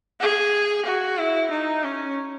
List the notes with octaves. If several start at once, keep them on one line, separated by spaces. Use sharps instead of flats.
G#4
F#4
E4
D#4
C#4